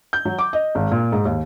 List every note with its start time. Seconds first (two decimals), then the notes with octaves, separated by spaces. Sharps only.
0.13 G6
0.25 F#3
0.39 D6
0.53 D#5
0.75 G#1
0.92 A#2
1.12 G#2
1.25 D#2